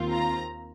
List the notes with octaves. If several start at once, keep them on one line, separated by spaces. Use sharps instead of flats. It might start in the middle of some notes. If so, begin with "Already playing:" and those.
Already playing: D#2 D#3 C4 F4
A#5